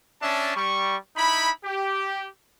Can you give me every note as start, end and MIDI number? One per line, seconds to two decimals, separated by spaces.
0.22 0.53 61
0.22 0.53 62
0.22 0.53 76
0.22 0.53 81
0.55 0.96 55
0.55 0.96 85
1.16 1.50 63
1.16 1.50 64
1.16 1.50 83
1.64 2.25 67